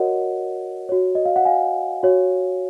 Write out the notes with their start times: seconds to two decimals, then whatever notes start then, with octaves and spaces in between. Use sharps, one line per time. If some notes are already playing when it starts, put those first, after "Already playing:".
Already playing: F#4 A#4 C#5 D#5 F#5
0.89 F#4 C#5
1.15 D#5
1.25 F5
1.36 F#5
1.45 F5 G#5
2.03 F#4 C#5